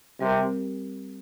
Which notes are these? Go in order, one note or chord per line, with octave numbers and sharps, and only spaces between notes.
C3 G3 C4 G4 A#4